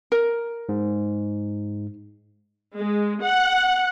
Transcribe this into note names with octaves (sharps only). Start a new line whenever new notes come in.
A#4
G#2
G#3
F#5